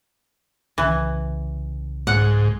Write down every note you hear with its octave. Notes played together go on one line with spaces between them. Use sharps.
C2 C#3 E3
G#2 F#5